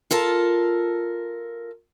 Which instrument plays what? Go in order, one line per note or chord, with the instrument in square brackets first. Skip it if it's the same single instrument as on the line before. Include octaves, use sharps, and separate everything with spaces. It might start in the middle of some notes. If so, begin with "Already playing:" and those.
[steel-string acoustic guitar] F4 A4 A#4 A5